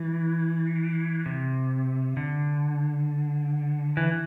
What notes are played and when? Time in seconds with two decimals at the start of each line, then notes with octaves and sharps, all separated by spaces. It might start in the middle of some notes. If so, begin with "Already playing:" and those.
Already playing: E3
1.26 C3
2.17 D3
3.97 E3